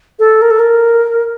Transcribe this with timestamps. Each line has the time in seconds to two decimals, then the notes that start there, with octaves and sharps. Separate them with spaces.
0.19 A4
0.42 A#4
0.51 A4
0.59 A#4